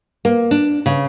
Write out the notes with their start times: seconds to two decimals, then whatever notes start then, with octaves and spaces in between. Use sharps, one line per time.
0.25 A#3
0.51 D4
0.86 C#3